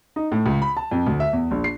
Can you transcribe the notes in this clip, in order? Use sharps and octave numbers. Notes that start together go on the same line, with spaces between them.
D#4
A2
C#2
B5
A5
F2
D2
E5
E2
A#1
C7